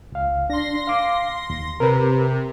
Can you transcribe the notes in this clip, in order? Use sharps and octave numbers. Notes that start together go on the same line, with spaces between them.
C#2 F5
D4 C6 A#6
F5 D6
D#2
C3 A#4 B4